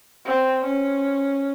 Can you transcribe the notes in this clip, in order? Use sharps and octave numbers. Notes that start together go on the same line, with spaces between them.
C4
C#4